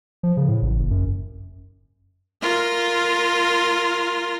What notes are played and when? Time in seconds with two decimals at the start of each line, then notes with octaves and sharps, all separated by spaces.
0.23 F3
0.37 C#3
0.48 A2
0.62 A1
0.79 F#1
0.91 F#2
2.42 F4 A#4